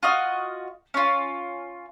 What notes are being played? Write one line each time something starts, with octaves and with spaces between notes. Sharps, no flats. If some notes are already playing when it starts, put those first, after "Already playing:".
F4 F#4 D#5 F6
C#4 F4